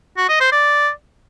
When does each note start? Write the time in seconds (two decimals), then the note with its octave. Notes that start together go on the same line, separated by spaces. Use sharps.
0.17 F#4
0.29 D#5
0.40 C5
0.52 D5